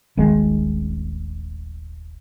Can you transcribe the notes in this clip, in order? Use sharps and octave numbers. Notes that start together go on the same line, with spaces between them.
D#1 G#1 D#3 G#3